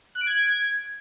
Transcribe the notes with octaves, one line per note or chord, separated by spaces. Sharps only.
F#6
D7
G#6